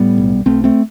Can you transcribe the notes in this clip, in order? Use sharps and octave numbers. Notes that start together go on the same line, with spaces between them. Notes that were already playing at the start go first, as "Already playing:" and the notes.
Already playing: A2 G3 B3
B1
B1 A3 C4
A3 C4